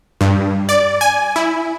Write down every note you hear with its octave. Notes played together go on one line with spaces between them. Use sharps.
G2
D5
G#5
E4